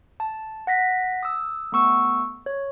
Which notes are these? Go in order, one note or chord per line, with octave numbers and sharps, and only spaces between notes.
A5
F#5 A#6 B6
D#6 E6
A3 B3 C#6 E6
C#5